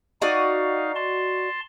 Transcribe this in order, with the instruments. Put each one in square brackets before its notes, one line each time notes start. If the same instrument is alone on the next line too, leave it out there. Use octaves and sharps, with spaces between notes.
[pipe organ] D#4 F5 [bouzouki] F#4 D5 D#5
[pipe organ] A5 C6